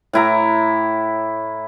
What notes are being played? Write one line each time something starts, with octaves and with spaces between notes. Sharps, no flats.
A2 E4 A#5